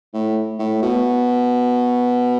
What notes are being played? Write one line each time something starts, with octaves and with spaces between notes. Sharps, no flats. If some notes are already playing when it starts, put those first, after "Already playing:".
A2
A2
B2